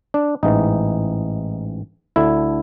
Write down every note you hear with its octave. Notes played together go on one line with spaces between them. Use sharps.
D4
A1 G#2 E3 D#4
D2 D3 E4